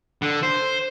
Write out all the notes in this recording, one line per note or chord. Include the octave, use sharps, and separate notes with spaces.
D3
C5